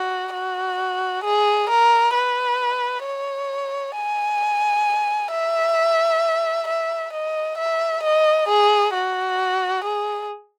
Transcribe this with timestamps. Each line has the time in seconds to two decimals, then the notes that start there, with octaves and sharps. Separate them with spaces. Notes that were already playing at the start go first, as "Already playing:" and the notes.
Already playing: F#4
0.34 F#4
1.25 G#4
1.70 A#4
2.15 B4
3.06 C#5
3.96 G#5
5.32 E5
6.68 E5
7.13 D#5
7.58 E5
8.04 D#5
8.49 G#4
8.94 F#4
9.84 G#4